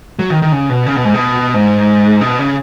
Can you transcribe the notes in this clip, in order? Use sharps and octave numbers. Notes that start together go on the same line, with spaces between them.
F#3
D#3
D#3
C#3
B2
C#3
B2
G#2
B2
G#2
B2
C#3